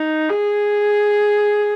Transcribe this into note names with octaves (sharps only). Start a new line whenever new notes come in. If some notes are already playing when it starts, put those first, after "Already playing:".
Already playing: D#4
G#4